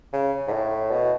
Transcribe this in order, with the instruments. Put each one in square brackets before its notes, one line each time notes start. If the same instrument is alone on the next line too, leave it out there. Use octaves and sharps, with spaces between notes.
[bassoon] C#3
G#2
A2
B2